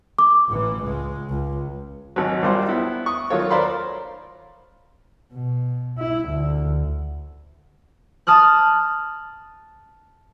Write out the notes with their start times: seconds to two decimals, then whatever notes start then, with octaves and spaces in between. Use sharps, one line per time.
0.19 D6
0.48 A1 E3
0.84 C#2 G#3
1.29 C#2
2.16 G#1 F#3
2.43 A#1 G3 A#3 F4 G4 C5
2.69 B3 E4
3.06 C#6 D#6
3.30 D#3 F#3 F4 A4 C#5
3.51 A#4 C5 D5 F5 B5 C6
5.33 B2
5.98 E4
6.29 D2
8.27 A5 D#6 F6 F#6